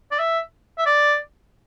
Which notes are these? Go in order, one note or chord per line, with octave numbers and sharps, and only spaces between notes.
D5
E5
E5
D5